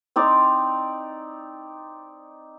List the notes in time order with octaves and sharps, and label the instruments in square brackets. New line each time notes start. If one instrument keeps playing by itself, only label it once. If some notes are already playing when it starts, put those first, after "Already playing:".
[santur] C4 D#4 D5